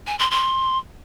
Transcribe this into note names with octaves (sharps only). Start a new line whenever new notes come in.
G#5
C6
C6